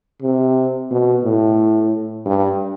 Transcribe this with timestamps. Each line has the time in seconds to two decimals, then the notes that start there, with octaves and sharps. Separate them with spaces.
0.22 C3
0.91 B2
1.24 A2
2.26 G2